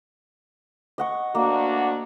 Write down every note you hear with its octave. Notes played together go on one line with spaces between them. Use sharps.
D#5 F#5 C#6
D2 A#3 D4 F#4